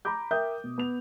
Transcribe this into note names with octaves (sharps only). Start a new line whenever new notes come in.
A#5 B5 D6 G6
A#4 E5 G5 D#6 G6
B2
B3 F7